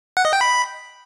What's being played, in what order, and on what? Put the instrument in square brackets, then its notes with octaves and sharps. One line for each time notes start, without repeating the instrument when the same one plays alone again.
[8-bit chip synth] F#5
D#5
G5
B5